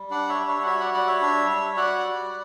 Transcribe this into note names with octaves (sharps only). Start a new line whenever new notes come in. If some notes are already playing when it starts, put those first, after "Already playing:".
Already playing: G3
D4 D5 F#5
C#5 E5
G3
C#5 E5
F#5
F#4 C#5 E5
D5 F#5
G3 D5 F#5
C#5 E5
D4
G3
E5
F#4 D5 F#5
G3